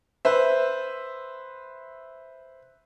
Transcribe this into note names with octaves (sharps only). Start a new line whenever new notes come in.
B4 C5 E5